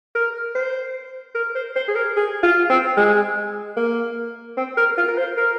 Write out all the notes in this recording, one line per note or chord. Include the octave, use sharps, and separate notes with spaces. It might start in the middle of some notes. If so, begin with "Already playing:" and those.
A#4
C5
A#4
C5
C5
G#4
A#4
G#4
F4
C4
G#3
A#3
C4
A#4
F4
A#4
C5
A#4